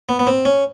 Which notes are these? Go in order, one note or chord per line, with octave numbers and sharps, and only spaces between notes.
B3
B3
C4
C#4